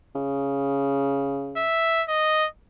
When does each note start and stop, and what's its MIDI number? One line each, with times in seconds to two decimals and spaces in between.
0.15 1.67 49
1.57 2.03 76
2.08 2.47 75